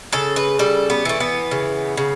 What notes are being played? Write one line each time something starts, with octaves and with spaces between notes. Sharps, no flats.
C#3 A4
B4
G3 A4
B3
E3 A3
B3
C#3
C#3